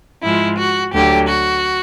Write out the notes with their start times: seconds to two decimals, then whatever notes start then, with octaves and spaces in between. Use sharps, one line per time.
0.22 G#2 F3 G#3 E4
0.58 F#4
0.93 D2 D3 F#3 G4
1.29 F#4